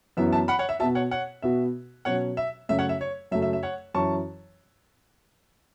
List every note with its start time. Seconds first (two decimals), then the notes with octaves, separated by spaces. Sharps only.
0.17 F#2 E3 B3 E4 E5
0.32 E5 A5
0.48 F#5 B5
0.59 C#5 F#5
0.69 E5
0.79 B2 B3 F#4 E5 A5
0.95 C#5 F#5
1.11 C#5 F#5
1.42 B2 B3 F#4 E5
2.05 B2 F#3 C#4 F#4 C#5 F#5
2.37 E5
2.69 F#2 C#3 A3 C#4 E5
2.79 C#5 F#5
2.89 E5
3.01 C#5
3.31 F#2 C#3 F#3 A3 E5
3.42 E5
3.53 E5
3.63 C#5 F#5
3.94 F#2 E3 C#4 E4 A5 C#6